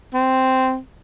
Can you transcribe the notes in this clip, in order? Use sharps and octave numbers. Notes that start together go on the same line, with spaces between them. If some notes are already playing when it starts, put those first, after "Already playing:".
C4